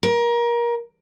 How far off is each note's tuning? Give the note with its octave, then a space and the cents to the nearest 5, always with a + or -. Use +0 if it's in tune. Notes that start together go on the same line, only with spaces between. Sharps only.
A#4 +25